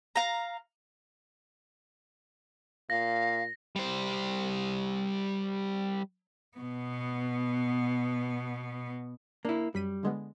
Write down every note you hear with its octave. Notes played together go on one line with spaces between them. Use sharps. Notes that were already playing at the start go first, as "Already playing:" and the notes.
F5 A#5
A#2 F5 A#6
G3 C5
B2 B3
A#3 D4 E4
F#2 G3 B6 D#7
D3 G#3 B3